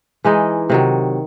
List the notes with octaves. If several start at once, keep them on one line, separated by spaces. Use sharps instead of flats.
E3 G#3 D#4
C3 D#3 F#3